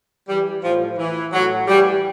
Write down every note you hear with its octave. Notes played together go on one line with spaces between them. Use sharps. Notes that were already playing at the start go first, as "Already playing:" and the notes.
E3 G3
A2 F3
E3
A2 F#3
E3 G3